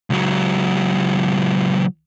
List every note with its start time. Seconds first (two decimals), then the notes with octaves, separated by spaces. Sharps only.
0.10 C#2 F#3